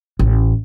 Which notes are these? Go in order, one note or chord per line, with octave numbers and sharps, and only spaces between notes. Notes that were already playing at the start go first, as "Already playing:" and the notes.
A1